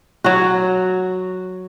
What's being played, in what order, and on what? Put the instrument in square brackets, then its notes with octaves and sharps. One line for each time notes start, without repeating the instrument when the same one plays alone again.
[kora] F#3 F#4